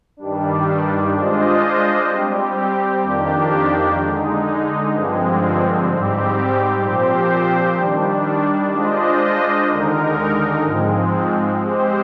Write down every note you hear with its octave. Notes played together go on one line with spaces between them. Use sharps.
G2 D#3 G3 D4
G#3 D4 F4 C5 D#5
G3 C4 G4
F2 D#3 A#3 D4 G4
D3 G#3 D#4
G2 D3 F3 G#3 C4
G#2 G3 C4 G4
A#2 F3 C4 G4 C5
D#3 G3 D4
G#3 D4 F4 C5 D#5
D#2 D3 G#3 D#4 A#4
G#2 F3 G#3 C4
G#3 C4 G4 C5